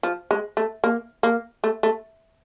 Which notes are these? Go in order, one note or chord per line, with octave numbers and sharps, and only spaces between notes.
F3
G#3
A3
A#3
A#3
A3
A3